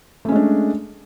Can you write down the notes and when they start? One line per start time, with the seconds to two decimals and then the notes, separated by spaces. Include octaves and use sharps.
0.25 A3
0.29 C#4
0.32 G#3
0.36 D4